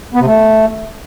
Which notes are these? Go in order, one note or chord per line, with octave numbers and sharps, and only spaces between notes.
B3
C3
A3